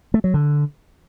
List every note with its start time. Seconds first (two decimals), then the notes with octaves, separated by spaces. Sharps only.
0.14 A3
0.24 F#3
0.34 D3